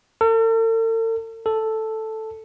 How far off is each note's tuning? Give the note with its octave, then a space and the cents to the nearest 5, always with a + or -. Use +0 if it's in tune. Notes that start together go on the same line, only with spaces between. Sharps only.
A4 +45
A4 +0